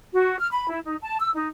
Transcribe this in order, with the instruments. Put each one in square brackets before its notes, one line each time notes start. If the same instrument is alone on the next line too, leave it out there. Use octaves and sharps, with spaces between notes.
[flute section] F#4
F6
B5
E4
D#4
A5
E6
D#4